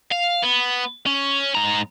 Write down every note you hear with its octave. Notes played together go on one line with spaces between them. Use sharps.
F5
B3
C#4
G#2 A#5